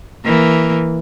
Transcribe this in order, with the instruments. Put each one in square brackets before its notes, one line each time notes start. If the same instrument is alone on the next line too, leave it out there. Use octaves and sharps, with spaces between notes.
[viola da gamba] E3 A#3